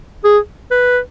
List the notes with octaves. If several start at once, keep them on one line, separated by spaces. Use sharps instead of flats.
G#4
B4